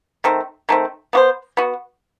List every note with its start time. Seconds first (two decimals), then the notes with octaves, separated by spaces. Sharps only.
0.24 D#3 A3 C4
0.69 D#3 A3 C4
1.13 B3 F#4 C5
1.57 B3 F#4